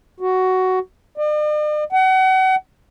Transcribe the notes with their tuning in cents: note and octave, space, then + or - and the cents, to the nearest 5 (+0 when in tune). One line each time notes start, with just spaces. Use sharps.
F#4 +10
D5 +45
F#5 +35